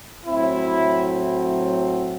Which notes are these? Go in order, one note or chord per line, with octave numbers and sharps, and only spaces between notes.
A2 F#3 C4 E4